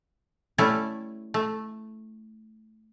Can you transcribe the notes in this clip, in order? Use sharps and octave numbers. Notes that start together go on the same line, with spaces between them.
G3 A3 C#4 E4 A4
A3